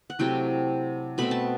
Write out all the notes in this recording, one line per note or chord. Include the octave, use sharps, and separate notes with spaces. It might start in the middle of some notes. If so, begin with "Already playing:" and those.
F#5
C3 F#3 A3 E4 G5
B2 A3 C4 B5
A5